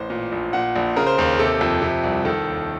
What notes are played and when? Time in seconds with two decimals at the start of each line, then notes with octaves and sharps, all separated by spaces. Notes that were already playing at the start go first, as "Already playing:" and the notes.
Already playing: A1 C5
0.10 A#2
0.32 A#1
0.53 A#2 F#5
0.76 A#1
0.96 C#3 A#4
1.07 C5
1.18 D#2 A#4
1.39 C3 A4
1.61 F2
1.82 C3
2.04 C2
2.25 D#3 A4
2.47 D#2